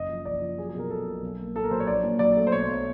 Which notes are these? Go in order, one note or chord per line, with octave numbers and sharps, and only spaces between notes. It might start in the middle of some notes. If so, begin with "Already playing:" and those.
Already playing: F#1 D#5
F3
F#1 D5
F3
F#3 G#4
G#4
B2 A#4
B2 A4
B1
B1
A#3
A#2 A4
A#4
F#3 C5
C#5
A#1 D5
A#2
F#3 D5
A3
C5
B2 C#5
B1